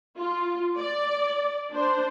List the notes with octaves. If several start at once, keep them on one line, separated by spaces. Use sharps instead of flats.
F4
D5
D4 C5